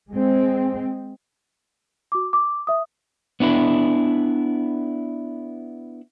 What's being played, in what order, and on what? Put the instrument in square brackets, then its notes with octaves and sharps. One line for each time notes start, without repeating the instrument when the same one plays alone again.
[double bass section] G#3 C4
[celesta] F#4 D6
D6
E5 D#6
[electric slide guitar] B3 D4 E4 B4